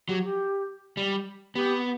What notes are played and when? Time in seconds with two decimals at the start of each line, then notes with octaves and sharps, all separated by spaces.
0.08 F#3 G4
0.24 G4
0.97 G3
1.55 B3 G4